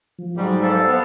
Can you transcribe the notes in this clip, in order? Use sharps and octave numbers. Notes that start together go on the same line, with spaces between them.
F3
G#2 F#3 G3
A4 C5 F5
B3